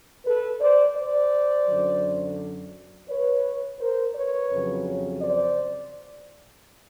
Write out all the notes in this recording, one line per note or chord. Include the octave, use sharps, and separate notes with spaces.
A4 B4
C5 D5
C5 D5
F#2 D3 F#3
B4 C#5
A#4 C5
B4 C#5
F2 C#3 F#3
C5 D5